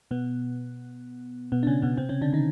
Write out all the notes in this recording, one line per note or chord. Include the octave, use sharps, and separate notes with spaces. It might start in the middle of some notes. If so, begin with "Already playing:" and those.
B2 B3
B2 B3
D4
C#3 C#4
B2 B3
C3 C4
C#3 C#4
D3 D4
D#3 D#4